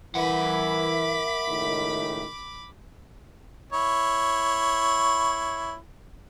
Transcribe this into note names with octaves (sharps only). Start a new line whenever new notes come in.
E3 A#4 E5 F#5 B5 D6
C#2 A2 D#3
E4 C#5